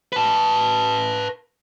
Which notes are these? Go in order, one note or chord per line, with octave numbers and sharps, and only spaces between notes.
B4 A5